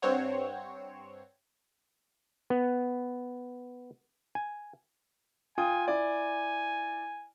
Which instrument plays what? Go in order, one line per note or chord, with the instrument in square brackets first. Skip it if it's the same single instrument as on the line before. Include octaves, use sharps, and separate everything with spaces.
[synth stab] G2 C4 C5 C#5 F#5
[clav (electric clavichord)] B3
G#5
[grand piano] F4 G5 D#6 [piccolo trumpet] G#5
[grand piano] E4 D5 [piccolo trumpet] G#5